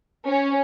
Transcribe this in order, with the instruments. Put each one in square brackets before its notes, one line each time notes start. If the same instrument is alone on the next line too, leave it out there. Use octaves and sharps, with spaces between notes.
[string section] C#4